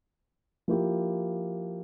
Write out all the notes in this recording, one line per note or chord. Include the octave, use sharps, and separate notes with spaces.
F3 A#3 E4 G4